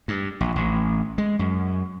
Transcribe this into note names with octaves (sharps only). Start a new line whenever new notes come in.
G2
A#1
A1
G#3
F#2